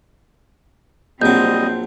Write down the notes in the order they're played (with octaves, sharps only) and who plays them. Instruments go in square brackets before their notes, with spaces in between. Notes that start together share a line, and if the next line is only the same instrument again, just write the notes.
[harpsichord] A#1 F#3 [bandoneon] G3 D#5 [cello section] C4 [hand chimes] G6